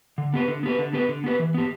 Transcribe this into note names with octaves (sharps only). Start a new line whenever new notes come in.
D3
B3 G4 B4
D3
B3 G4 B4
D3
B3 G4 B4
D3
B3 G4 B4
E3
B3 G4